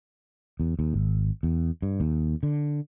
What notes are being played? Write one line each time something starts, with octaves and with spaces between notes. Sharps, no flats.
E2
D#2
G#1
E2
G2
D#2
D3